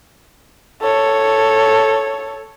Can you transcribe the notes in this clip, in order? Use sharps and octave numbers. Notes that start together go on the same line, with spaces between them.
A4 C#5